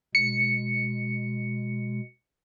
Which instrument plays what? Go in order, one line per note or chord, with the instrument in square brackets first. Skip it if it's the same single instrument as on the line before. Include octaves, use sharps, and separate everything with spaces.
[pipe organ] B2 G#3 [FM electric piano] C#7